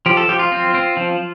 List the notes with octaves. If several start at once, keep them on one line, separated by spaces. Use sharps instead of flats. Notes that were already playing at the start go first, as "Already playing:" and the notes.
F3 G4
A4
F3 G4
F4
C4
C4
F3